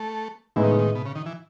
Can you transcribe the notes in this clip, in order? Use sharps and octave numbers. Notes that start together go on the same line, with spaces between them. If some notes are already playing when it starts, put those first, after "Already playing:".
Already playing: A3
A2 E3 G#3 B3 D#4
D#3
C#3
D#3
B2
C#3
D#3
E3